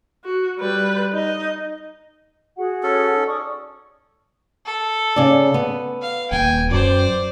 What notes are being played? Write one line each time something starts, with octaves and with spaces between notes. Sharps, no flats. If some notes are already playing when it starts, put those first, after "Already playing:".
F#4
G3 B4
D#4 D#5
F#4 G#4 F#5
C#4 A4
D#4 E6
D5 C#6 D#6
A4
C#3 D5
B3
F5
D#1 G5 G#5
F#2 C5 D5